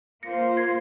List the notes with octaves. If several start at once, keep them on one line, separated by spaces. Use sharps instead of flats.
A#3 F4 C5 A#6 C#7
G#6 C7